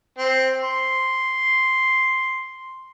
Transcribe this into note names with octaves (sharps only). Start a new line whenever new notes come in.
C4
C6